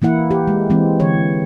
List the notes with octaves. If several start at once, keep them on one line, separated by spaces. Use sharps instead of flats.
E3 A#3 E4 F#5
G4
G#3
E3 G#3 C4
D3 E3 C#5